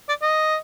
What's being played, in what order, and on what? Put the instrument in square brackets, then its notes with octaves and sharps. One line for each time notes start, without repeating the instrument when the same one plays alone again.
[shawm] D5
D#5